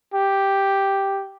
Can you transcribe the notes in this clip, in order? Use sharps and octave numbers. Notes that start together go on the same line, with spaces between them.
G4